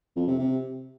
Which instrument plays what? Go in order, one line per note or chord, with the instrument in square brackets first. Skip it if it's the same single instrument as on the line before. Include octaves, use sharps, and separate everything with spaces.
[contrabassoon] F2
C3
C3